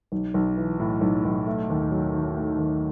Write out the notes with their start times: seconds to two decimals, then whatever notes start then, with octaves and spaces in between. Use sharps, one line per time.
0.12 B1
0.34 B1
0.57 E3
0.80 A2
1.01 B1
1.25 B1
1.47 A3
1.70 D#2
1.91 F#3
2.14 D#3
2.37 A3
2.58 D#2